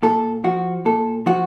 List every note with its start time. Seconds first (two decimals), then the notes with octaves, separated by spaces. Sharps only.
0.03 A#2 A4
0.44 F3 F#4
0.85 A#2 A4
1.26 F3 F#4